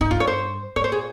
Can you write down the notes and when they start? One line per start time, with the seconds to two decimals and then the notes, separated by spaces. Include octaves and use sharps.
0.01 G#2 D#4
0.11 G2 F4
0.20 C#5
0.27 C5
0.76 G#2 C#5
0.84 C5
0.92 A#2 G#4